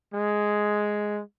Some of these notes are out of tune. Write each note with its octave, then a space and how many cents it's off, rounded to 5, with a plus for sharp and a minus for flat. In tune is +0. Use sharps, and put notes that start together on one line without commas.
G#3 +5